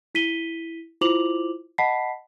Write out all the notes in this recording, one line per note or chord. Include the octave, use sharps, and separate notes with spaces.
E4 B6 D#7 G7
E4 F4 C5 D6 F7 F#7
D#5 F#5 A5 B5 B6 C7